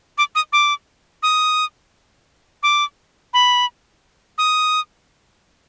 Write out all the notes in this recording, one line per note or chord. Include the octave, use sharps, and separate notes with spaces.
D6
D#6
D6
D#6
D6
B5
D#6